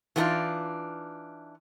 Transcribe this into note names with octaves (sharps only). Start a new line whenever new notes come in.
E3 G#3 B3 D4 D#4 F4